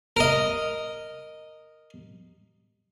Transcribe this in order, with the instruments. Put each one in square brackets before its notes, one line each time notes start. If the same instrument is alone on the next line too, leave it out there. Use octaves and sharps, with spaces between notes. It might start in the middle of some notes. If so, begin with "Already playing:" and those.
[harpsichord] A#4 D#5